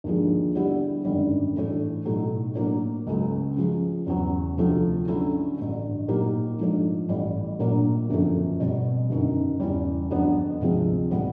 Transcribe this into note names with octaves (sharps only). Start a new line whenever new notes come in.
D#2 D3 F3 G#3
D3 G3 B3 E4 G4
G#1 F#2 D3 G3
A2 E3 A3 D4
B1 A2 F#3 A3
A2 F#3 A#3 D4
C#2 C#3 F#3 A3
C#3 F3 G#3
E2 C#3 F#3 B3
D2 C3 F3 A3 C4
D3 F#3 A3 C#4 E4
A1 G2 D3
A#2 F#3 A#3 D#4 G4
G#2 F3 A3 D4
A1 A2 E3 G3
A#1 A#2 F#3 A#3 D4
G1 F#2 C#3 F3 A3
B2 G3 C4
G1 F#2 D#3
E2 C#3 E3 G3
F2 D3 F#3 B3 D4
D2 C3 F3 G#3 C4
A2 E3 G3 B3